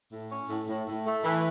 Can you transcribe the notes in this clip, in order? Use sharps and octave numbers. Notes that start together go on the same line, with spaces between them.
A2
C#4
A2
A2
A2
A3
E3